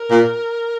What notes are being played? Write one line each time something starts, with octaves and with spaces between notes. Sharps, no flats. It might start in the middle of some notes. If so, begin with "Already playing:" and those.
Already playing: A#4
A#2